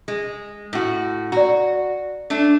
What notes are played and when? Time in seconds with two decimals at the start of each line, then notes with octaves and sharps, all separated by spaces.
0.08 G#3
0.73 A2 F#4
1.32 F#4 D5 A#5
2.30 A3 D4